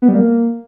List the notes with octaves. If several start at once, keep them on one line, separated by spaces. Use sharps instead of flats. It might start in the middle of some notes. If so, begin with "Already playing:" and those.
B3
G3
A#3